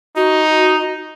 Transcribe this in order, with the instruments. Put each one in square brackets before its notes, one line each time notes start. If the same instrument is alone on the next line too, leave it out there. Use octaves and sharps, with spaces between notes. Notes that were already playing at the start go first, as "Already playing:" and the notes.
[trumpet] D#4 [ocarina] F#4